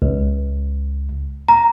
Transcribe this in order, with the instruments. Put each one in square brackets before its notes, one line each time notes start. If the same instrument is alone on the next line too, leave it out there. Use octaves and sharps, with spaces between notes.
[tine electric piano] C#2
[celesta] A#5